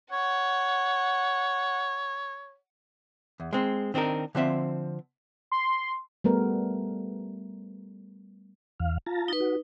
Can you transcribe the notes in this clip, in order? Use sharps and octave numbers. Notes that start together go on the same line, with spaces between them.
C#5 F#5
E2
G#3 C4
D#3 C4 D4 D#4 A#4
D3 F3 C4 E5
C6
G3 A3 B3 A#4
E2 F5
F4 A5 A#5
D#4 B4
F#4